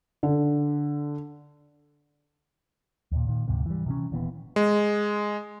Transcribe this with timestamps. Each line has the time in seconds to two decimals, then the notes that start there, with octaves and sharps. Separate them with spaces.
0.23 D3
3.12 D#2 A#2
3.27 A#2 D#3
3.48 D2 G#2 C3
3.66 E3 G3
3.86 C3 E3 C#4
4.12 D#1 D#2 E3 B3
4.56 G#3